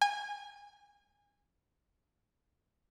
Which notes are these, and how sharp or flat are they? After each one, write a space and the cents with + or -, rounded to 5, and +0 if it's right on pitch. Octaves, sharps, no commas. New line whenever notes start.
G#5 -25